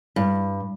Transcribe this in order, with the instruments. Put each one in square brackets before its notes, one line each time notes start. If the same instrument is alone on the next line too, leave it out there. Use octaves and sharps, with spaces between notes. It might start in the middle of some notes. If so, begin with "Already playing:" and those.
[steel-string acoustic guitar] G2